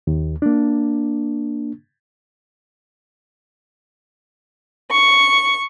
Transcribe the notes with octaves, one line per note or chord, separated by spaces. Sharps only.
D#2
A#3 D4
C#6